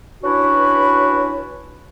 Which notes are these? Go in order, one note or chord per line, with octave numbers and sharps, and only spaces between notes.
C#4 D4 E4 F#4 B4